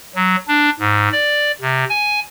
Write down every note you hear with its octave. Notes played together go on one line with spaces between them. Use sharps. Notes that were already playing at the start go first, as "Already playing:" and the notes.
F#3
D4
G#2
D5
C3
G#5